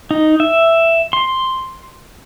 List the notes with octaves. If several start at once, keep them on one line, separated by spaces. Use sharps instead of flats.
D#4
E5
C6